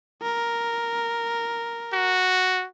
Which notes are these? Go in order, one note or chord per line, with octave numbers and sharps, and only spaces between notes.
A#4
F#4